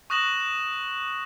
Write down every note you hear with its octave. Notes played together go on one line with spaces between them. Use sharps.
C#6 D#6 F#6 A#6 E7 F#7